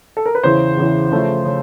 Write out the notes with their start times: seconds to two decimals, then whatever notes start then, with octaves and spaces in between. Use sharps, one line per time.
0.17 A4
0.26 A#4
0.35 B4
0.43 E2 C#3 E3 C5
0.77 E2 C#3 E3
1.12 C#3 F3 A3
1.45 C#3